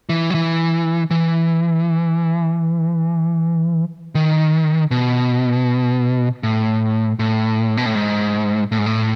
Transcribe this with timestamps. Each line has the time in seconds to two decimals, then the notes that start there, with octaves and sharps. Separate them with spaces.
0.09 E3
0.30 F#3
0.35 E3
1.11 E3
4.15 D#3
4.91 B2
6.43 A2
7.19 A2
7.77 B2
7.86 A2
7.95 G#2
8.72 A2
8.78 G#2
8.86 A2